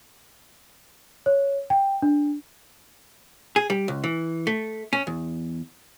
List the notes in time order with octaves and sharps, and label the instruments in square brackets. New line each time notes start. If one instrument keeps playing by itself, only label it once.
[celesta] C#5
G5
D4
[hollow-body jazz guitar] G#4
G3
C#2
E3
A3
C#4
E2